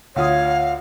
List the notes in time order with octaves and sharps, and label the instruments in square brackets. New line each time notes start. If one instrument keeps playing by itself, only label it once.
[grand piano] D2 F4 D#6 [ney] C#5 [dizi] F5